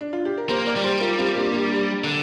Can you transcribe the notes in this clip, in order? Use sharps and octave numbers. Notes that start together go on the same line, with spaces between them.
D4
F4
G4
A#4
A#3 G4 C5
A#4 D5
G3
G4 C5
F4 A#4
C4 F4
A#3 D4
A#3 D4
D3